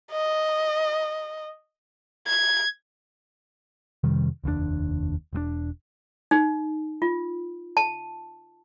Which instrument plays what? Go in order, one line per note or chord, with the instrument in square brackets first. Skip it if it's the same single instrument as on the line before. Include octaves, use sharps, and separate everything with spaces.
[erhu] D#5
G#6
[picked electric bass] F2 C3 D#3 G3
F1 D#2 B2 D4
E1 G2 D4
[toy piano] D#4
F4
A5